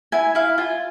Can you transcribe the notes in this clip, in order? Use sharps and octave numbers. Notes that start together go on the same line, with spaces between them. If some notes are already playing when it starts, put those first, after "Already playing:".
E4 G#5
E4 F5
F4 G#5